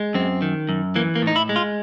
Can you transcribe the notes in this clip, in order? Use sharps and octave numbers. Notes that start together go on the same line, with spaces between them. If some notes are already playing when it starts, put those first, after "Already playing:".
Already playing: G#3
F#2 C4
D#3
F#2
E3 A#3
A#3
A2
D#4
E4
G#3
F4